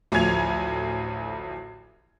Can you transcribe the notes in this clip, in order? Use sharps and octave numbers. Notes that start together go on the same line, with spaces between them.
A1 D2 F3 G#5 G#6 F7